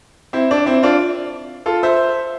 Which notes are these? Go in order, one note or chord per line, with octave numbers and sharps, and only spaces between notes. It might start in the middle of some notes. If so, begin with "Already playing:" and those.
C4 E4
D4
C4 E4
D4 F4
F4 A4
C5 E5